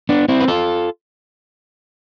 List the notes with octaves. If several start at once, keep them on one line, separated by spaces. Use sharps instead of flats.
B3 D4
C4 E4
B4
F4 A4